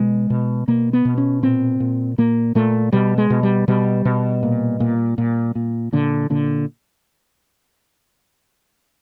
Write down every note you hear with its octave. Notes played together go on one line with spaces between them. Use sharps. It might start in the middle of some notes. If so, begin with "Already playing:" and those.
Already playing: B2 G#3
B2
B2 A#3
B3
B2
C#4
A#2 C4
A#2
A#2 A#3
A#2 A3
B2 G3
G#3
B2
G3
B2 G3
B2
A#2
A#2
A#2
A#2
A#2 D3
A#2 D3